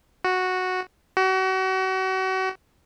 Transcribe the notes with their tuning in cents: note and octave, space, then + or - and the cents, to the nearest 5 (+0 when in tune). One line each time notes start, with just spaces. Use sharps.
F#4 -5
F#4 +35